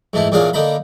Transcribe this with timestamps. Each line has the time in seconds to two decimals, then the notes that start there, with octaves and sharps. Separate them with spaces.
0.14 G#2 E3 A3 E4
0.32 E2 A#2 C#4 D4 G#4 F5
0.53 D3 A#3 D#4 A#5 B5